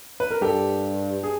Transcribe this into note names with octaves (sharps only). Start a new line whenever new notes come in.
B4
A#4
G2 G4 A4
G#4